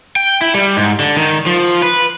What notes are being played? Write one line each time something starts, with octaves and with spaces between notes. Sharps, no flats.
G5
E4
G3
G#2
D3
D#3
F3
B4